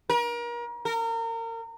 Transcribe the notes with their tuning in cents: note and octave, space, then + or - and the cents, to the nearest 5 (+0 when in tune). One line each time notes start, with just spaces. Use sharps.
A#4 +35
A#4 -30